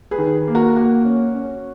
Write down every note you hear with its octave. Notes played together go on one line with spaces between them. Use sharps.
G#4 B4
D#3
A#3
F#4 A#4
A#3 F#4
C#4
C#4